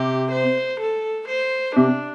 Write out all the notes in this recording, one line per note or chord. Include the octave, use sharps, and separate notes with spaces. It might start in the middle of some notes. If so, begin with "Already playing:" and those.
Already playing: C3 G4
C5
A4
C5
C3 D4